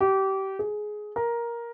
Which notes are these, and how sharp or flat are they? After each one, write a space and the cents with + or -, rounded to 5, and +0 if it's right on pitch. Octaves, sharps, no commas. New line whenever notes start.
G4 -25
G#4 +15
A#4 +10